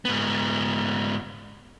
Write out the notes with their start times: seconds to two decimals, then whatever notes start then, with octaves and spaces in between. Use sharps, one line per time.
0.05 G#2 B3